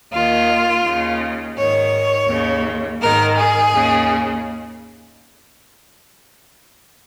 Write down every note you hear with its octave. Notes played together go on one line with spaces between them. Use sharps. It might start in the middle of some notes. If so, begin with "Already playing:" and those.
D#2 D#3 F4
D#2 C#3
G#2 D#3 C#5
D#2 C#3
G#2 D#3 A#4
G#4
D#2 C#3